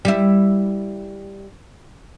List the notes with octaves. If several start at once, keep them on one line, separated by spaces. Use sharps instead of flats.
G3 E4